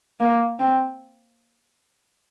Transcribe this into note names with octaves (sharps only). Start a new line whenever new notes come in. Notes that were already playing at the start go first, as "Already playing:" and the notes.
A#3
C4